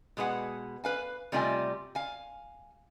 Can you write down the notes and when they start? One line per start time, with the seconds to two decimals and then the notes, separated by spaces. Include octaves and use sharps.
0.17 B2 G#3 G#4 B4 F#5
0.84 B4 F5 G#5
1.32 C3 G3 A3 F4 D#5 G#5
1.95 F5 G#5